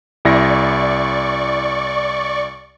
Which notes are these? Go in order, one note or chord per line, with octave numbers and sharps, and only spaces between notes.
C2 E4 D5 C#6 A#6